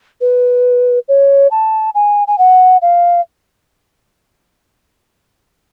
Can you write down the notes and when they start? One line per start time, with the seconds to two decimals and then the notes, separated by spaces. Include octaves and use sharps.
0.21 B4
1.08 C#5
1.51 A5
1.95 G#5
2.27 G#5
2.38 F#5
2.82 F5